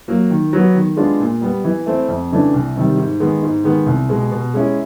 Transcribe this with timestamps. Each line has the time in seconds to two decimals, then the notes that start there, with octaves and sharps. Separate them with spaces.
0.08 F#3 A#3
0.30 D#3
0.53 F#3 B3
0.75 D#3
0.97 G#3 B3 D4 F4
1.20 A#2
1.41 G3 B3
1.64 E3
1.86 A3 C4 E4
2.08 F2
2.31 C#3 E3 A3 D4
2.53 C2
2.76 C3 D#3 G3
2.97 G#2
3.20 D#3 G#3 B3
3.43 G#2
3.64 D#3 G#3 B3
3.86 C2
4.09 B2 G#3
4.31 B2
4.54 G#3 C#4 E4 G#4